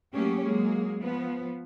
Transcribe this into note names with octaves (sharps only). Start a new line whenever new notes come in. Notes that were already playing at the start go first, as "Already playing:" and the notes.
F#3 A3 A#3 C#4 G4 G#4
F#3 G#3 A#3 G#4
F3 B3